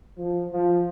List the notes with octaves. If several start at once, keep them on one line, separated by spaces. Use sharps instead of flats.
F3
F3